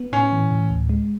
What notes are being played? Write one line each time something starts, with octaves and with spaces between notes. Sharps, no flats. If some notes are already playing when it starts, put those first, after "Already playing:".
Already playing: B3
A2 C#4
E3
A2
D2
G#3